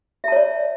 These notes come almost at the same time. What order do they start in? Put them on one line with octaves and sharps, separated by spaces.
E5 A5 C#5 D5